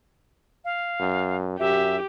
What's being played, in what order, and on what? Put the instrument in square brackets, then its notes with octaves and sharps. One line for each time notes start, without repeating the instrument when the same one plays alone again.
[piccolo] F5
[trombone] F#2
[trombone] F#2 [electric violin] G4 [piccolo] E5